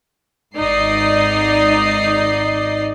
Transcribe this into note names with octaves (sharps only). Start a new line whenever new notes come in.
G#1 G#2 D#4 D5 D#5 C7